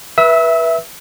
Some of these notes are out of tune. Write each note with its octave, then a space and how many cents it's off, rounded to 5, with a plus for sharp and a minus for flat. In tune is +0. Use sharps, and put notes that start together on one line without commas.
B4 -25 E5 +0 E6 -35